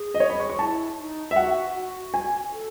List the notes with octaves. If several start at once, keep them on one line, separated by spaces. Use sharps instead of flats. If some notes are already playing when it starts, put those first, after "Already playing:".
Already playing: G#4
D#5
C#5
B5
C#6
C#6
E4 A5
D#4
E5
F#4 F#5
F#4
G#5
A4